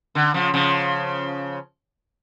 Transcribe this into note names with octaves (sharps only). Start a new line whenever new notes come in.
D3
C#3 F3
C#3 F3